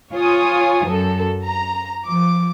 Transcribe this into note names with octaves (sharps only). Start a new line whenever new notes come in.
F4 C#5 G#5 D#6
F#2 A4
A#5
F3 D6